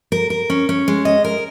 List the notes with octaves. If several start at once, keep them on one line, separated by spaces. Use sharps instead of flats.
A#4
A#4
C#4
C#4
G#3
D#5
A#4